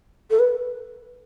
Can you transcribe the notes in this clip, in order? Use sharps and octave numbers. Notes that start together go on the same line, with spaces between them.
A4
B4